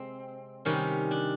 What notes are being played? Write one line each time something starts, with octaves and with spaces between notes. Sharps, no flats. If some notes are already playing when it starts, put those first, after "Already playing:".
Already playing: C3 G#3 C4
C3 D#3 G3 C#4
D4